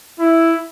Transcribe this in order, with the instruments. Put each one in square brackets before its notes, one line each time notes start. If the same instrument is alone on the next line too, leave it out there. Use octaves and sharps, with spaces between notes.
[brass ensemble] E4